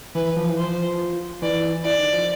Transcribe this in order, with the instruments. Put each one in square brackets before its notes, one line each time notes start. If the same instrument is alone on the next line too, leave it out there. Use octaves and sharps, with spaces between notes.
[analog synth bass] E3 [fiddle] B4
[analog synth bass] F3
E3
[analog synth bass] F3 [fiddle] C5
[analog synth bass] E3 [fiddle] D5
[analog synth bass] E3 [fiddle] D5
[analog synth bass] D#3
F3